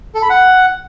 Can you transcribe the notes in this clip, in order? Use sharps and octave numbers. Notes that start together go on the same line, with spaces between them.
A4
B5
F#5